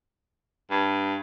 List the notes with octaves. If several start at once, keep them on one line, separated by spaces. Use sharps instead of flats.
G2